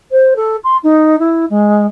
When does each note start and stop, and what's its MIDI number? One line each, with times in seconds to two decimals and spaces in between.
0.11 0.33 72
0.36 0.56 69
0.63 0.76 84
0.83 1.18 63
1.19 1.45 64
1.49 1.86 56